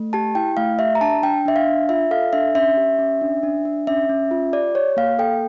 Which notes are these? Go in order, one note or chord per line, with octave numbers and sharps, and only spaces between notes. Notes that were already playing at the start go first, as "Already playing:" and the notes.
Already playing: A3
G4 A5
E4 G5
A3 F5
G4 E5
A#5
D4 A5
D4 G5
D4 E5
F5
D4
F4 E5
A4 F5
D4 E5
C#4 E5
G4
C#4
D4
D4
D4
C#4 E5
C#4
F4
G4 D5
G4 C#5
A#3 F5
A4 G5